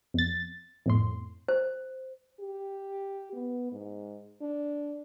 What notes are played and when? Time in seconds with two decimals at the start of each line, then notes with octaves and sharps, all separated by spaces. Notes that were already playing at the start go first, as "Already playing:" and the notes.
0.14 F2 A6
0.86 F2 A2 C6
1.48 C5
2.40 G4
3.33 B3
3.72 G#2
4.41 D4